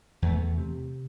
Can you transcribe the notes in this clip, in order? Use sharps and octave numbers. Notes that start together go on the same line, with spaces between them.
E2 A3
C3